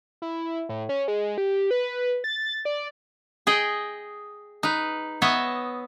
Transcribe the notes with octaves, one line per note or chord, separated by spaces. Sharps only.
E4
A2
C#4
G#3
G4
B4
A6
D5
G#4 D#5 G5
D#4 B4
B3 C#5 D#5 E5